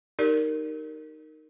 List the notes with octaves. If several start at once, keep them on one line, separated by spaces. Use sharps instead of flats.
D#4 G4 A#4 D5